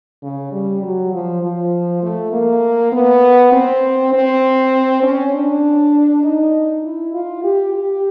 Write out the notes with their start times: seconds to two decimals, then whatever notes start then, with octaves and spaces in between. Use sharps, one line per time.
0.22 C#3
0.52 G3
0.82 F#3
1.12 F3
1.42 F3
2.03 A3
2.32 A#3
2.92 B3
3.52 C4
4.13 C4
5.03 C#4
5.33 D4
6.23 D#4
6.84 E4
7.14 F4
7.44 G4
7.74 G4